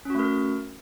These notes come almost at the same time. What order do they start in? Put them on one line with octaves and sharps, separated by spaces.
C#4 F#4 A3 A#4